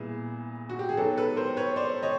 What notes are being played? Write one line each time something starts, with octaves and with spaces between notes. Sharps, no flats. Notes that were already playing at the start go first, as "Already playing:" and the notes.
Already playing: A#2 G3 B3 E4 G#4
F#4
G4
G#4
F#3 B3 D#4 G4 A4
A4 B4
A#4 C5
B4 C#5
C5 D5
C#5 D#5